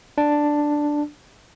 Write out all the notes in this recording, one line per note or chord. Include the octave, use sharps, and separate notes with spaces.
D4